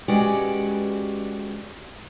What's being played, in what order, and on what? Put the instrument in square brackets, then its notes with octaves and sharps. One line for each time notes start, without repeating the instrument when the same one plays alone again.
[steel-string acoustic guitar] G#3 C#4 F#4 G4 B4 D5